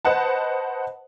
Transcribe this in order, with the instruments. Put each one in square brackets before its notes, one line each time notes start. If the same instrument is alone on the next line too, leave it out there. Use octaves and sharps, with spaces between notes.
[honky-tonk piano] B4 C5 D#5 F#5 A5